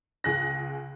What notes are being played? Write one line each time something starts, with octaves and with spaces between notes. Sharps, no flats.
C#2 G#4 F#6 A#6